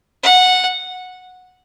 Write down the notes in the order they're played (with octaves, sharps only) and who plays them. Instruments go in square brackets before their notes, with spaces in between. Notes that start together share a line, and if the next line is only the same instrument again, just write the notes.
[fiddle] F#5